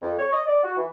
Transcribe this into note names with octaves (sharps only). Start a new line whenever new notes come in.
F2
C#5
D#5
D5
F#4
E3